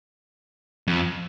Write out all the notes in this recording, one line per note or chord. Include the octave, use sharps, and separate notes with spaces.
F2